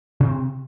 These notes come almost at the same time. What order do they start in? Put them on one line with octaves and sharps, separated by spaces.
C3 D4 C4